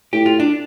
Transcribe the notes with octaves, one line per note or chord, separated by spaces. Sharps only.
A2 G4
F4
D4